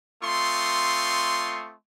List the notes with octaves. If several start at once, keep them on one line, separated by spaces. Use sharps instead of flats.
A3 C4 F4 C6 C#6 D#6